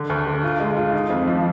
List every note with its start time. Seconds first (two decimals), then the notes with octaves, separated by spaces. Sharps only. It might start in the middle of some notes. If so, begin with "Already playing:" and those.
Already playing: D3
0.10 D2
0.27 D3
0.44 F4
0.60 G#3
0.77 F4
0.94 D#4
1.10 F2
1.28 F3